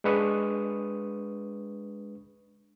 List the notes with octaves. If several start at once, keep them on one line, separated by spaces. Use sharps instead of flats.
G#3 D4 B4 C#6 D#6